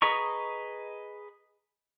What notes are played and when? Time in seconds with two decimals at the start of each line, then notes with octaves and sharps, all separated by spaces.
0.02 G#4 B4 D#5 A#5 C#6